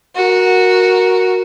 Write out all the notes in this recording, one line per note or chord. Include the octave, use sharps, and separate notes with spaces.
F#4 A#4